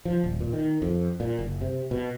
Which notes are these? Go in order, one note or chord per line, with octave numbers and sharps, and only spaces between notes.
F3
D#1
A#2
D#3
F2
A#2
F#1
C3
B2